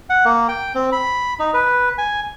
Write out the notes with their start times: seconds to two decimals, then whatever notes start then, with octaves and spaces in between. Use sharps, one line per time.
0.10 F#5
0.25 A#3
0.48 G5
0.75 C4
0.92 B5
1.39 D#4
1.54 B4
1.98 G#5